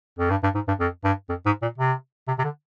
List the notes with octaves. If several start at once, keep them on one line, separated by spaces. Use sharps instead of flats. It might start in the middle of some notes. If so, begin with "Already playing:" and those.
F2
G2
G2
G#2
G2
F2
G2
F2
G#2
A#2
C3
C3
C3
D3